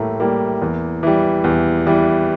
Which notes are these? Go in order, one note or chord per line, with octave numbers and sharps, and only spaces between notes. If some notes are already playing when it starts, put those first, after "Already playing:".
Already playing: A2 G3 A3 A#3
G3 A#3
E2
E3 G3
E2
E3 G3